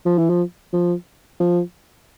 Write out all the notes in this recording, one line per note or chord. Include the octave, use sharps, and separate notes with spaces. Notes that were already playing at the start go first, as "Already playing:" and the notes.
F3
E3
F3
F3
F3